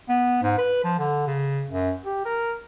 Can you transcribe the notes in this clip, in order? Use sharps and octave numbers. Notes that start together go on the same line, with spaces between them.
B3
G#2
B4
F3
D3
C#3
F#2
G4
A#4